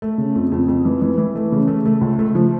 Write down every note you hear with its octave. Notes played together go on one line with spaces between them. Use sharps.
A3
C#3
F2
F2
F2
E3
E3
E3
A3
C#3
A3
A3
C#2
A3
F3